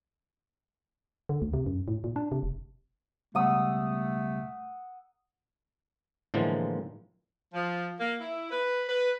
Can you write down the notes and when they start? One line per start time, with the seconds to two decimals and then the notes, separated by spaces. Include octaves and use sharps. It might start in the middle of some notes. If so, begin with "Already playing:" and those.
1.29 D3
1.42 D2
1.54 C3
1.66 F#2
1.88 A2
2.04 A#2
2.16 D4
2.32 C3
2.43 F1
3.35 C#2 B2 G3 A3 F#5 D#6 E6
6.34 A2 D3 E3 F3 G#3 A#3
7.54 F3
7.99 A#3
8.20 E4
8.50 B4
8.88 B4